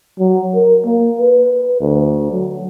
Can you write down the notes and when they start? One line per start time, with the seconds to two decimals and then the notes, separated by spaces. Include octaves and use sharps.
0.19 F#3
0.54 A#4
0.85 A#3
1.20 B4
1.81 D2
2.32 F#3